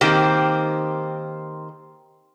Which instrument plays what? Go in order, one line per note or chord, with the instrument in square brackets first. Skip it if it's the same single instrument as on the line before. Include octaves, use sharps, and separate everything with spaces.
[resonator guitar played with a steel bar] D#3 A#3 C4 G4 C5